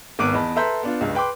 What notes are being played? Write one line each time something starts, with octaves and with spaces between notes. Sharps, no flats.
G#1 B3 D6 F#6 D7 D#7
E2 D#5 A5 B5
A4 B4 E5 A#5 C6 G6
B3 D4 F4
C#2 G2
B4 G5 C6 D6